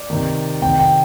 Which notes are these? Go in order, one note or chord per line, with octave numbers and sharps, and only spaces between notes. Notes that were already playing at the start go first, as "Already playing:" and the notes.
Already playing: D5
C3 D#3
C3 D#3 G5
G5